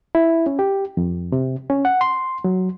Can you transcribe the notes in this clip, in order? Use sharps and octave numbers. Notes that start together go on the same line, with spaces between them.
E4
C#4
G4
F2
C3
C#4
F#5
C6
F#3